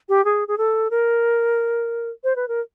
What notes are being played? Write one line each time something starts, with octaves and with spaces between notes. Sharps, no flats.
G4
G#4
G#4
A4
A#4
C5
B4
A#4